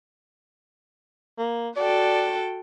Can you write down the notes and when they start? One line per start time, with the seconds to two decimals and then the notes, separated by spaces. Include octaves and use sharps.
1.38 A#3
1.76 F#4 A4 D5 G5